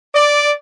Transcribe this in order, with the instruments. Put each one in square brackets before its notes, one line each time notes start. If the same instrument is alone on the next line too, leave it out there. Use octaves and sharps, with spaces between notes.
[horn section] D5